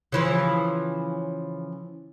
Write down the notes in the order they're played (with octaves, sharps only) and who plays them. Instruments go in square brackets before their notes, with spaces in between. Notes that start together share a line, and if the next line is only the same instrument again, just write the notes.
[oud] C#3 E3 F3